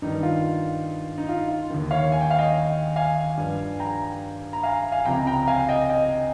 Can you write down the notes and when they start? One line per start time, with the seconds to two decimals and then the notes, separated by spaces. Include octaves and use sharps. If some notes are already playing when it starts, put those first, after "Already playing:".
0.02 G2 D#3 D#4
0.23 F4
1.18 D#4
1.29 F4
1.49 F4
1.70 D#2 D#3
1.91 C#5 F5
2.12 G#5
2.21 G5
2.31 F5
2.39 D#5 G5
2.96 F5 G#5
3.37 G2 F3
3.79 G5 A#5
4.53 A#5
4.63 F5 G#5
4.92 F5 G#5
5.05 C#2 C3 F3 G5 A#5
5.27 G5 A#5
5.47 F5 G#5
5.69 D#5 G5
5.89 D#5 G5